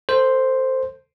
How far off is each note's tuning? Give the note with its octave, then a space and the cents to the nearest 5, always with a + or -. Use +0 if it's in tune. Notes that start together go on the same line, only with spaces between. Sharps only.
A4 +30 C5 +0